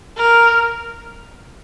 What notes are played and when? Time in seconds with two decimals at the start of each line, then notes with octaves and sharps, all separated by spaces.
0.17 A#4